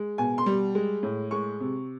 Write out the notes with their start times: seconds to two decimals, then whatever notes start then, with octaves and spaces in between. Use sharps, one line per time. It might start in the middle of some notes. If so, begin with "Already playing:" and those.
Already playing: G#3
0.18 B2 G#5
0.38 C6
0.46 G3
0.75 G#3
1.03 A2
1.31 G#3 C#6
1.60 C3